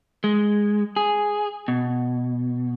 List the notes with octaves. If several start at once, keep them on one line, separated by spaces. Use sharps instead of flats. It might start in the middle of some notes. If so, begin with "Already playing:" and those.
G#3
G#4
B2